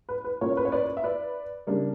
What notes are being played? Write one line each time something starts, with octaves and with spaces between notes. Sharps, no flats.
B4
B4
A#2 A#3 C#4 C#5
B4
C#5
B4 D5
E5
B4 D5
C#3 G3 A#3 D4